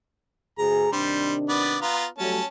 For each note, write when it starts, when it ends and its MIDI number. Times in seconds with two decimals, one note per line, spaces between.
0.58 0.88 38
0.58 0.88 68
0.58 0.91 82
0.93 1.81 48
0.93 1.81 51
0.93 1.34 55
0.93 1.81 62
0.93 1.34 72
1.49 1.77 59
1.49 1.77 74
1.82 2.05 59
1.82 2.05 65
1.82 2.05 82
2.18 2.39 54
2.18 2.39 55
2.18 2.39 57
2.18 2.46 61
2.18 2.46 81